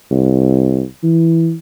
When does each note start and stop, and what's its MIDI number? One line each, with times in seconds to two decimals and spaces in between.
0.11 0.83 36
1.03 1.54 52